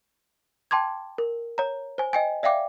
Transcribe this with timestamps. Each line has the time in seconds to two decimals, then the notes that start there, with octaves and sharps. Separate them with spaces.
0.71 G5 A5 C6 D6 G#6
1.18 A#4
1.58 C#5 A#5
1.98 C5 G#5
2.13 D#5 G5 G#5
2.43 D5 E5 F5 G5 D6